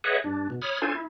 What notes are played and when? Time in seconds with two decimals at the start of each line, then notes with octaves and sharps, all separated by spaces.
0.04 G#4 B4 C#5 D#5 E5 F#5
0.24 G2 D4
0.50 B2
0.62 C#5 B5 D#6 F6
0.82 C#4 D4 F4 A4 C5 G#5
0.95 E4